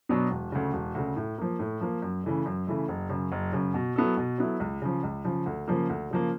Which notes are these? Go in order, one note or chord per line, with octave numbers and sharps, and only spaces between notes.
B2 F#3 B3 D4
E1
D2 C#3
E1
D2 C#3
A2
F3 A#3
A2
F3 A#3
F#2
C#3 E3 A3
F#2
C#3 E3 A3
F#1
F#2 C#3
F#1
F#2 C#3
B2
F#3 B3 E4 A4
B2
F#3 B3 E4 A4
C#2
C#3 F3
C#2
C#3 F3
D2
C#3 F3 A#3
D2
C#3 F3 A#3